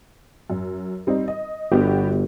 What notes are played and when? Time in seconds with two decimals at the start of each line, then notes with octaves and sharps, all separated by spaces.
0.50 F#2
1.07 G3 C4 D#4
1.28 D#5
1.72 G1 B3 F#4 G4